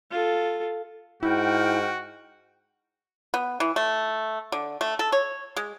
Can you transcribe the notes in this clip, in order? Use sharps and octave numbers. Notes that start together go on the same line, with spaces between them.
F4 A4
G#2 E4 F#4 G5 F6 G6
B3
E3
A3
D3
A3
A4
C#5
G#3